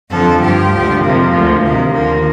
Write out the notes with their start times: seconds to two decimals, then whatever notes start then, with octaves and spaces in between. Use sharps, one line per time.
0.10 F2 D3 F3 A4
0.40 G2 F3 G4
0.71 D2 D3 F3
1.02 F2 C3 F3 A#3
1.32 D2 D3 F3
1.62 D2 C3 D#3 A#3
1.93 D#2 D3 F3 A#3